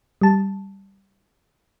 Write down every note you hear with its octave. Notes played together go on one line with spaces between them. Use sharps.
G3 A5